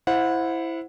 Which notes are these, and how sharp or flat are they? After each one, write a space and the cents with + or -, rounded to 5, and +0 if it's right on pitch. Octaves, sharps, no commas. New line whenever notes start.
E4 +5 C5 +0 F#5 -25